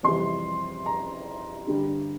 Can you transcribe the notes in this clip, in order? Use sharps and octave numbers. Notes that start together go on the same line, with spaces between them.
F2 C3 E3 G3 C6
A#5
G2 D3 G3